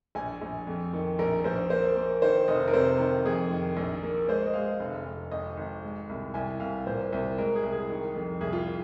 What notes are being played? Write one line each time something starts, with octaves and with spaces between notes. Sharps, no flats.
A#1 G#5
A#1
F2
D#3
A#1 A#4
A#1 C5
A#3 C5
A#3
D#3 C5
F1 D#5
A#4
C3 C5
D#3
F2 G#4
D#3
A#1
A#3
G#3 C5
D#5
G#3 F5
F1
F1
G#1 D#5
G#1
G#3
C2
C2 G#5
C2 F5
A#2 C5
C2
G#3 A#4
G#4
C2
G#4
D#3
F2
C2 G#4
F4